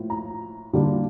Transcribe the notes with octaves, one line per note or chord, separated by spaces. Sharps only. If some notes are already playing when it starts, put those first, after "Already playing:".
Already playing: A2 F3 A#3
A#5
D3 G3 A#3 D4